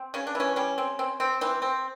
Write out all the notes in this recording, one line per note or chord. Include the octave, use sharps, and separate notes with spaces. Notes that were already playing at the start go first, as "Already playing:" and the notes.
Already playing: C4
C#3 C#4
D4
E3 C#4
G3 C#4
C4
C4
C4
E3 C4
C4